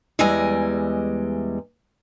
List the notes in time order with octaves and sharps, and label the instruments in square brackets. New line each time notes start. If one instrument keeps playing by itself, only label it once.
[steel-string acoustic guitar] E2 E3 G3 G#3 D#5 G#5